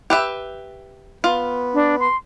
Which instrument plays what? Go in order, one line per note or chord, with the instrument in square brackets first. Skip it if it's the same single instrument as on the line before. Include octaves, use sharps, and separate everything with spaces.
[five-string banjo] G4 B4 E5
[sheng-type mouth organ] B3 [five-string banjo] F4
[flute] D4
C6